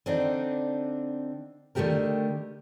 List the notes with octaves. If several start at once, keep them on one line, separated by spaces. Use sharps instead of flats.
D3 C4 D4 D#4
D3 D#3 A3 F#4 G4 A#4